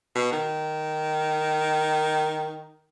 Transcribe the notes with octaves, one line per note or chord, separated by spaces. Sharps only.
B2
D#3